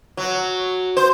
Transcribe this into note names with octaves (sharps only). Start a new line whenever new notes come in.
F#3
C5